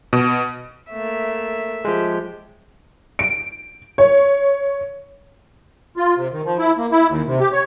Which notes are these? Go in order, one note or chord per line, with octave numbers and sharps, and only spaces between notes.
B2
A3 A#3 E5
F3 G#3 G4
D7
C#5
F4
C3
D#3
F3
E4
A#3
E4
D#2
C3
G4
C#5